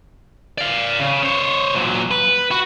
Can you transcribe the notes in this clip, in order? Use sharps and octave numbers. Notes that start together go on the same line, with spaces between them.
D5 F5
C#3
C5 C#5
A#2 F#3
B4
F#4